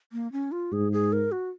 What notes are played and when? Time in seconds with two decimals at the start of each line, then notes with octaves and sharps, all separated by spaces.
0.12 A#3
0.32 C#4
0.52 F4
0.72 G#2 G#4
0.92 G#4
1.13 A#4
1.32 F#4